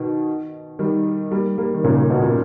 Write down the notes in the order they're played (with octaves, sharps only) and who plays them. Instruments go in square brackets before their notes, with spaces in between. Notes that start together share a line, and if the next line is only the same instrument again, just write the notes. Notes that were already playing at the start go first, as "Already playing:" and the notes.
Already playing: [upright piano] B2 D#3
D#3 G3
G3 A#3
G3 A#3
D#3
A#2 C#3
A#2
B2
A#2